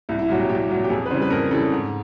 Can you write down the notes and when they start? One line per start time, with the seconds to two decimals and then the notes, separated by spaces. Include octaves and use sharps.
0.09 C2 E4
0.19 E4
0.29 A#2 F#3 F#4
0.39 G4
0.49 C2 G4
0.70 A#2 F#3
0.84 G4
0.90 F2 G#4
1.06 B4
1.10 C#3 E3 G3 C5
1.21 B4
1.30 F2 A#4
1.51 C#3 E3 G3 A4
1.72 G#2